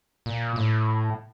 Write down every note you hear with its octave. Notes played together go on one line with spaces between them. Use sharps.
A#2
A2